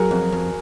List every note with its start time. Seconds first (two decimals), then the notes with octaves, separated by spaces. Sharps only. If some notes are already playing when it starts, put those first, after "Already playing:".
Already playing: F#3 F#4 G#4 A#4
0.11 F2
0.32 F2